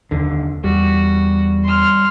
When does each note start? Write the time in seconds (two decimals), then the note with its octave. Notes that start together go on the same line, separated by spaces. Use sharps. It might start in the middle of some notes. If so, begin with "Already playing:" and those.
0.11 F1 D#2 D3
0.64 E2 G3 F#4
1.64 C6 F6